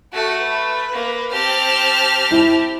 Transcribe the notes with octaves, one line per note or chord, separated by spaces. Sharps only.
A3 F#4 A4
B4
A#3
C4 G4 A5 F6
E4